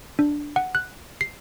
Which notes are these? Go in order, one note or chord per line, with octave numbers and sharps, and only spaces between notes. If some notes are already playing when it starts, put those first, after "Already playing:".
D4
F#5
F#6
C7